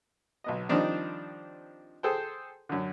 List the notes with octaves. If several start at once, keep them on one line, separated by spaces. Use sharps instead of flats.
B1 B3 D#5
D#3 F3 G3 C4 D4 D#4
G#4 A4 C5 G5
F#2 D3